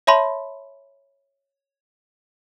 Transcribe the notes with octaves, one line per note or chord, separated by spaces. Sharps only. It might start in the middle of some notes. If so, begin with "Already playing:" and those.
C#5 E5 A5 B5 C6